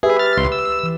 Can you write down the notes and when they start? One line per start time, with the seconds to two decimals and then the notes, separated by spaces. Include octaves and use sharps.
0.03 G4 G#4 B4 E5
0.19 F6 A6
0.37 C#2 C6
0.52 E6
0.83 E3